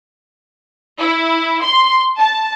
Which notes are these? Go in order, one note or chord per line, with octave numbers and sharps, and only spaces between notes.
E4
C6
A5